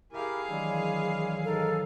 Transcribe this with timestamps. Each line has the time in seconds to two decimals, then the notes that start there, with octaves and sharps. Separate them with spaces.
0.13 E4 G4 G#4 A#4 F5
0.48 D#3 E3 F#3 G#3 D4 E4
1.44 G#2 D#4 A4 A#4